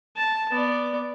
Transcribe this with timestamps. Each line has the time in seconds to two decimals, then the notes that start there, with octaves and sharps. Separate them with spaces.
0.17 A5
0.51 B3 D5